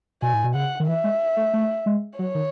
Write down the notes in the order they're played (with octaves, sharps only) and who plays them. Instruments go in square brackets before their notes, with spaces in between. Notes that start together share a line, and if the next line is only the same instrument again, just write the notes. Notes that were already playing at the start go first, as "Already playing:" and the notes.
[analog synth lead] B2 [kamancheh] G#5
[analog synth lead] A2
B2
[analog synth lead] C#3 [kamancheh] F#5
[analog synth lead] D#3
[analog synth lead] E3 [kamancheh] E5
[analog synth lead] G#3
A3
A3
G#3
[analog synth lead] F#3 [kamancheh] C#5
[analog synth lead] D#3